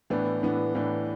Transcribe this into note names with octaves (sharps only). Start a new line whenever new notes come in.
A2 E3 B3 D4
A2 E3 B3 D4
A2 E3 B3 D4